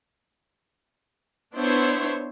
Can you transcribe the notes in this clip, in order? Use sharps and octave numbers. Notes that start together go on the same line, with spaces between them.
B3 D4 E4 C5 C#5